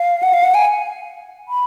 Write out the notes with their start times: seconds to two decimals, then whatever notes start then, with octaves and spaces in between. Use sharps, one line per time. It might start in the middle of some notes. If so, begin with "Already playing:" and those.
Already playing: F5
0.23 F#5
0.33 F5
0.43 F#5
0.54 G#5
1.48 B5